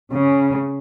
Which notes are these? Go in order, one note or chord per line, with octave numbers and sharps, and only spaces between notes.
C#3